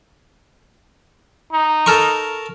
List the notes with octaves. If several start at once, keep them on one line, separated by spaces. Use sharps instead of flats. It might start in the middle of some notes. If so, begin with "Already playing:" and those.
D#4
A4 A#4 C#6